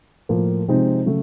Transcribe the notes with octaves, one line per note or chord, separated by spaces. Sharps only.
A2 F3 A#3
C3 F3 G#3 C4 D#4
C#3 F#3 A3